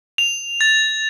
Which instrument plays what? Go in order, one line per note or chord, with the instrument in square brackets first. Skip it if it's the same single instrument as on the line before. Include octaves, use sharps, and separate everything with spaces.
[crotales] F7
A6